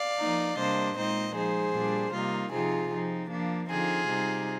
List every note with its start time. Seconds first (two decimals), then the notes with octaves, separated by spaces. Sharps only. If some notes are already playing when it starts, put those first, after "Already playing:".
Already playing: D5 F5
0.19 F3 A#3 D#4
0.58 C3 G3 A#3 D4 C5 D#5
0.96 A#2 G#3 C4 D#4 C5 D#5
1.35 F3 G#3 D#4 G#4 C5
1.74 A#2 G3 D4
2.13 C3 G3 A#3 D#4 F4
2.52 C3 F3 C4 D#4 F4 G#4
2.92 F3 C4 D#4
3.31 F3 A#3 D4
3.69 D3 F3 C4 D#4 F4 G#4
4.09 C3 G3 C4 D#4